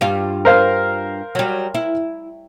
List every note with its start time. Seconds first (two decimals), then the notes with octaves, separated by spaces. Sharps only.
0.01 G2 G3 F4
0.45 A#4 C5 F5
1.35 F#3 G3
1.74 E4